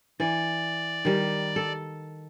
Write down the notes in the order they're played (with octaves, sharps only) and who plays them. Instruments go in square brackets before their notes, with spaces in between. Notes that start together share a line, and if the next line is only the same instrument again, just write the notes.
[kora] E3 [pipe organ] D5
[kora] D#3 G3
A4